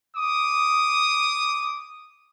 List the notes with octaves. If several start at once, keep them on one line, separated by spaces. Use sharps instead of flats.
D6 D#6